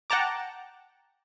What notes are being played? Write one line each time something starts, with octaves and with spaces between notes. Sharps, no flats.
F#5 G5 A5 A#5 D6